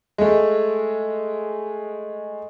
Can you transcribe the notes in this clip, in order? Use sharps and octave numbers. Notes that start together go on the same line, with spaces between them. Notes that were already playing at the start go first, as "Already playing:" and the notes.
G#3 A3